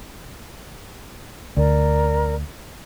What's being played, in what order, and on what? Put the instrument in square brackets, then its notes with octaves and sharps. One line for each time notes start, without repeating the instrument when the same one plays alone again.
[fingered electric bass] D2 [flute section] A#4 D5